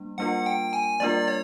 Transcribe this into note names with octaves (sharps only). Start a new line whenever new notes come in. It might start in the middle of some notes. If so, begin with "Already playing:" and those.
Already playing: G3 A#3 D4
G3 A#3 D4 F4 A#4 F#5
G5
G#5
G3 A#3 D4 F4 A#4 D5
C#5